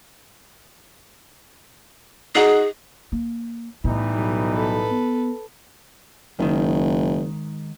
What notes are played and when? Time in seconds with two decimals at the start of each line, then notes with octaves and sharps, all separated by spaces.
2.35 D#4 F#4 G#4 D#5
3.12 A#3
3.84 A2 E3 G3 B3 D#4
4.15 B1
4.53 A4 B4
4.91 B3
6.39 F#1 G#2 D#3